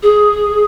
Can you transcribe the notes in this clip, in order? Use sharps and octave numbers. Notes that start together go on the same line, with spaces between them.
G#4